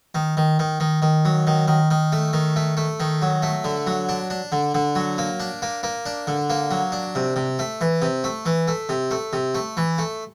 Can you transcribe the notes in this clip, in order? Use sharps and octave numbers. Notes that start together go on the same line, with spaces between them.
D#3
D#3
D#3
D#3
D#3
F#3
D#3
D#3
D#3
A3
D#3
A3
A3
D#3
F#3
A3
D3
F#3
D4
D4
D3
D3
F#3
A#3
D4
A#3
A#3
D4
D3
A#3
F#3
D4
C3
C3
A3
E3
C3
A3
E3
A3
C3
A3
C3
A3
E3
A3